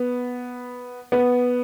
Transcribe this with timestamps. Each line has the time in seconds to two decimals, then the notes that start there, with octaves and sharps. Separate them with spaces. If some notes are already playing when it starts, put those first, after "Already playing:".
Already playing: B3
1.12 B3